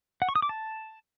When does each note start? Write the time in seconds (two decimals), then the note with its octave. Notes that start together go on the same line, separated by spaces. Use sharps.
0.22 F#5
0.29 C#6
0.36 D#6
0.42 D6
0.49 A5